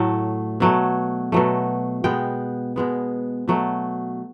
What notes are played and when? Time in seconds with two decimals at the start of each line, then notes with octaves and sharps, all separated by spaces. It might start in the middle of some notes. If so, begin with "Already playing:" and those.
Already playing: A2 F#3 A3
0.60 B2 F#3 A3
1.32 B2 F#3 A3
2.04 B2 G#3 B3 G5
2.76 B2 G#3 B3
3.48 B2 F#3 A3